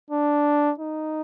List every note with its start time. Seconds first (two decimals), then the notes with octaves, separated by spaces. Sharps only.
0.11 D4
0.79 D#4